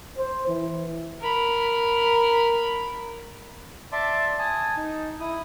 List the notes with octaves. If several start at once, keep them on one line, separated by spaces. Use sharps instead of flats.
C5
E3
A#4 B5
D5 E5 A5 C6 D6
G#5 A5 D#6
D#4
E4 D#6